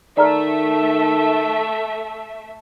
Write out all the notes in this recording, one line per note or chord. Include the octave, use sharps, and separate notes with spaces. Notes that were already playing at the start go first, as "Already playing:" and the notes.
D#3 A3 A4 D5 E5 A#5 F6